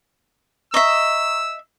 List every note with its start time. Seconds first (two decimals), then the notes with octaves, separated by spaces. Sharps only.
0.74 D#5 E5 A#5 C#6 D#6 E6